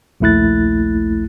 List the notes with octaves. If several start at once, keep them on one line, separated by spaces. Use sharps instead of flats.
A#1 D#2 A3 E4 F#6 A6